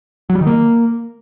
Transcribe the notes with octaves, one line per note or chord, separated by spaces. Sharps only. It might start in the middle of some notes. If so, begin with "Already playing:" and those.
F#3
G3
D#3
A#3